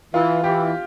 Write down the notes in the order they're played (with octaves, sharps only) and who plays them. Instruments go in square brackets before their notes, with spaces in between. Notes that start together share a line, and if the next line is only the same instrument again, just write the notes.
[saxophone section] E3 [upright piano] F4
[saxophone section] E3 [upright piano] G4